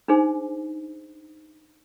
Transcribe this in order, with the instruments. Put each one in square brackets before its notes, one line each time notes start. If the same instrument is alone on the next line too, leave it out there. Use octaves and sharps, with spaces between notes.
[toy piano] D4 D#4 G#4 C5